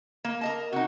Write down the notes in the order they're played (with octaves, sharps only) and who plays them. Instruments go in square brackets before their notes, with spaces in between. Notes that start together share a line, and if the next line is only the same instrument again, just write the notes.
[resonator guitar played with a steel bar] A#3
A#4 D#5 A5
[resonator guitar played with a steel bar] C3 D#4 [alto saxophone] F#4